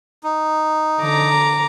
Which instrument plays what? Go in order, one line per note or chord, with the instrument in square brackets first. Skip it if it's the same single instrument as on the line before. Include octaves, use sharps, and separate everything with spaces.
[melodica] D#4
[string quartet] D3 A#5 D6